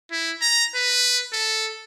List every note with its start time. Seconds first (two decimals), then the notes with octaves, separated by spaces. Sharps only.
0.12 E4
0.41 A#5
0.75 B4
1.33 A4